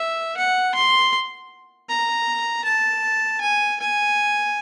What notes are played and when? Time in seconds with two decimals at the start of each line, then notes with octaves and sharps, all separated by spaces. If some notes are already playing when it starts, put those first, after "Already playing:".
Already playing: E5
0.37 F#5
0.74 C6
1.89 A#5
2.64 A5
3.41 G#5
3.80 G#5